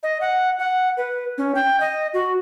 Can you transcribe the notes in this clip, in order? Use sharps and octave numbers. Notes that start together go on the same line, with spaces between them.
D#5
F#5
F#5
B4
C#4
G5
D#5
F#4